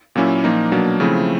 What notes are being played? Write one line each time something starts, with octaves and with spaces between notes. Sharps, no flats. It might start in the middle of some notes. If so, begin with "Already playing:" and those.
A#2 F#3 A#3 C#4 E4
A#2 F3 A#3 D#4
B2 F#3 A#3 D4
C#3 F3 A3 C4 E4